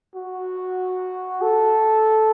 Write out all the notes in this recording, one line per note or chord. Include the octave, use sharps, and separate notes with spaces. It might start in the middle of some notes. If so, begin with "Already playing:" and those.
F#4
A4